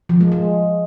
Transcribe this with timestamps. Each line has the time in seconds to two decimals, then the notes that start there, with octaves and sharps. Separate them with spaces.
0.09 F3
0.21 G#3
0.32 G#3